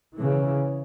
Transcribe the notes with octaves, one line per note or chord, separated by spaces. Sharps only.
C#3 E3